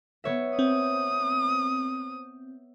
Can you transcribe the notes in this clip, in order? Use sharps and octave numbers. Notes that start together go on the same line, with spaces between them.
B3 C#5 E5
C4 D#6